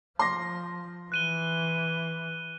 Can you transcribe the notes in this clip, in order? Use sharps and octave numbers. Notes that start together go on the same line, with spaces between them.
F3 C6 A#6
E3 F#6 D#7 G7